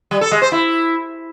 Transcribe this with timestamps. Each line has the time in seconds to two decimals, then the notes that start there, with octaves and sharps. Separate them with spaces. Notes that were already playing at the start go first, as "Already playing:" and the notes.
0.11 G3
0.21 A4
0.31 G#3
0.42 C5
0.52 E4